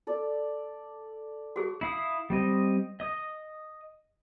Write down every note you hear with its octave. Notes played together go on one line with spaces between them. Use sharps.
A4 D5
F#4 G#4 C#6
E4 F5 D#6
G3 C4 D#5
D#5 D#6